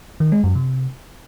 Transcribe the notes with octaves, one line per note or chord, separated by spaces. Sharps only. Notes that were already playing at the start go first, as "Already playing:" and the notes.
D#3
G#3
F#2
C3